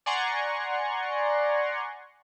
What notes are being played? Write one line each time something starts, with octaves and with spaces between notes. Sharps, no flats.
D5 F#5 G#5 A#5 C6 C#6